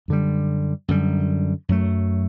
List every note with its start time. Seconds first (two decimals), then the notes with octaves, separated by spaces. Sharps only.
0.08 F#2 D3 G3
0.88 F#2 D3 G3
1.69 F#2 F#3 A3